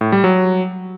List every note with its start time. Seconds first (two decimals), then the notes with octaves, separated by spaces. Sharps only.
0.01 A2
0.12 G3
0.24 F#3